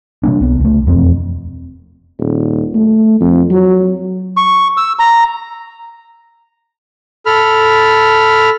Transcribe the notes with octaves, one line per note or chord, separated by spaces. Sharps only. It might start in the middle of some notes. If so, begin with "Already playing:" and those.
C3 G3 A#3 D4
C2 B3
C#2 A3
E1 F2 C4
D#1
A3
F2
F#3
C#6
E6
A#5
A4 B5 F6